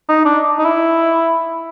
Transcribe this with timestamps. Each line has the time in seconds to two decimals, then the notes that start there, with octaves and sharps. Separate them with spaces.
0.09 D#4
0.25 D4
0.59 D#4
0.65 E4